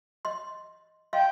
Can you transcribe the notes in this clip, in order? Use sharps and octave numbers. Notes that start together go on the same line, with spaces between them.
D#5 C6
D#5 F5 G5 C6